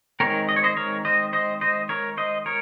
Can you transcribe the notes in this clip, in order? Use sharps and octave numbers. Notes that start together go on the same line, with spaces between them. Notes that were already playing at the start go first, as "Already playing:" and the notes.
D#3 G#3 C4 A#4 C#5
D#5
C#5
C5 D#5
A#4 C#5
C5 D#5
C5 D#5
C5 D#5
A#4 C#5
C5 D#5
A#4 C#5